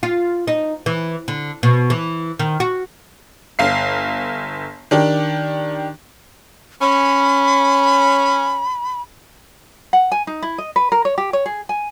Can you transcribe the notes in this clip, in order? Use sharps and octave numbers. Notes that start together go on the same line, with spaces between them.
F4
D#4
E3
D3
B2
E3
D#3
F#4
G1 F5 C7
D#3 D4 G4
C#4 B5
F#5
G#5
D#4
E4
D#5
B4
A#4
C#5
G4
C#5
G#4
G#5